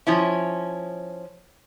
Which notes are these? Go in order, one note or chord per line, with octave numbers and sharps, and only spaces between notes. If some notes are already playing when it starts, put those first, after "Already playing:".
F3 C#4 E4